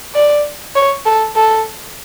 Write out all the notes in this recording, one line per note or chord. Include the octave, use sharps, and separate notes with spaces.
D5
C#5
A4
A4